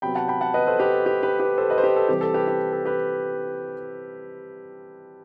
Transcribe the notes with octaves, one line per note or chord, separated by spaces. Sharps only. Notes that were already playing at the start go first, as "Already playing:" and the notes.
C3 F#3 B3 G5 B5
F#5 A5
G5 B5
F#5 A5
B4 D#5
A4 C5
G4 B4
A4
G4
G4 B4
G4 B4
A4 C5
B4 D#5
C5
G4 B4
A4
C3 E3 G3 C4 G4
A4
G4 B4
G4
A4
G4 B4